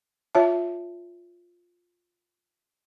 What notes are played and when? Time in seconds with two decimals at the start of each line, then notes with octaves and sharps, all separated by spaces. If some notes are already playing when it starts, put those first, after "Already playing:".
0.35 F4 C#5 E5 A5